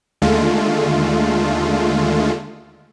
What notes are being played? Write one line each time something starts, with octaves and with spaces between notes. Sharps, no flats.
D#2 D3 G#3 A3 F4